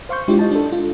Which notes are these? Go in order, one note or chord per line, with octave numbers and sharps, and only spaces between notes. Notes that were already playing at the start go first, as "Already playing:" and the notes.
C5 F5 C6 C#6 G6
G#3 D4 E4 F4 G4
D#5 A5
D4 A4
F4